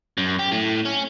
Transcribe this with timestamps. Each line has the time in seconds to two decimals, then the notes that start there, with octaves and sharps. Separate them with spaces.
0.18 F#2
0.39 G4
0.52 A2
0.85 C#4